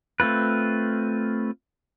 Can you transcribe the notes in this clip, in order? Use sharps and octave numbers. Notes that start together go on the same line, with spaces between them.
A3 C4 F4 B4